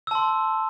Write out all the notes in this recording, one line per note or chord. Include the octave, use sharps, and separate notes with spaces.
A5 C6 E6